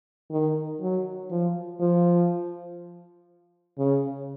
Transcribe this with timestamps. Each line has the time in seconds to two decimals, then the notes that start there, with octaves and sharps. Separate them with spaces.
0.31 D#3
0.81 F#3
1.31 F3
1.80 F3
3.78 C#3